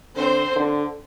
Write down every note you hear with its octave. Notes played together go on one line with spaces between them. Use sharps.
D3 C4 C5
D3